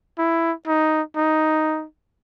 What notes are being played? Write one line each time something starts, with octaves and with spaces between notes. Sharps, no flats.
E4
D#4
D#4